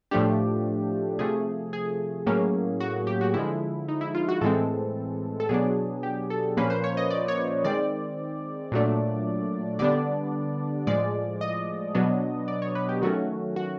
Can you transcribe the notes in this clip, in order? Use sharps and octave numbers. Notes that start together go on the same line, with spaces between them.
A2 F3 A3 D4 G4
C3 F3 A3 G#4
G#4
A2 F#3 A#3 C#4
F#4
G4
F#4
D3 F3 G#3 E4
D#4
E4
F4
F#4
A2 E3 G#3 C4 A4
A4
B2 F#3 B3 D4 G#4
G4
A4
A#2 F3 A#3 C#4 B4
C5
C#5
D#5
D5
C#5
D#3 G#3 C4 D5
A#2 F#3 A3 D4
D3 G3 B3 D4 D5
A2 F3 G#3 D5
D#5
B2 F#3 B3 D4
D5
C#5
B4
G4
D#3 F#3 A3 C#4 F#4
F#4